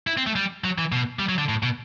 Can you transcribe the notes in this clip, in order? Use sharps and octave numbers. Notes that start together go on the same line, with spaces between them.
E4
C4
A3
G3
F#3
E3
B2
G3
F#3
D3
A2
B2